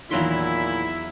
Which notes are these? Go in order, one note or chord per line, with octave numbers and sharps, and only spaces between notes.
E2 A#2 D#3 F#3 E4 F4 C6